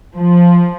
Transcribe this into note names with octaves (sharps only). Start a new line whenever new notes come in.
F3